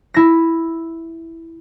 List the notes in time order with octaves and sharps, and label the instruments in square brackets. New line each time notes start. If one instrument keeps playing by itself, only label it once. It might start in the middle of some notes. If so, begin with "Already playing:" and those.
[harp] E4 A#6